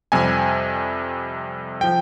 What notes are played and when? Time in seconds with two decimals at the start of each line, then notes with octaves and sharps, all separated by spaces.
0.12 F2 C3 G3 G#5
1.81 F3 G5